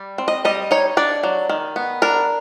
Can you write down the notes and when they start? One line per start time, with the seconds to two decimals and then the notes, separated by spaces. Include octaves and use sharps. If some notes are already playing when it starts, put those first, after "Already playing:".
Already playing: G3
0.18 C4
0.28 D#5
0.45 G3 D#5
0.71 D#4 C#5
0.97 D4 D5
1.23 F#3
1.49 D#3
1.76 B3
2.02 D4 A#4